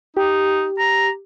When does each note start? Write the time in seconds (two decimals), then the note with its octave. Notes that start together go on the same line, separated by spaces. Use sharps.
0.17 D#4 G4
0.78 A#5